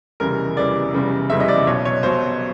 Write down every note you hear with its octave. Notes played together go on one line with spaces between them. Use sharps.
F1 E2 C#3 E3 G3 A#4
F1 E2 C#3 E3 G3 D5
F1 E2 C#3 E3 G3
F1 E2 C#3 E3 G3 E5
D#5
D5
B1 B2 F#3 C#5
C#5
B1 B2 F#3 C5